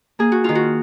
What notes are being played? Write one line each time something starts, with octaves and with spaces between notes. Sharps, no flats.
A#3 G#4
F#4
D#3 F4
F#4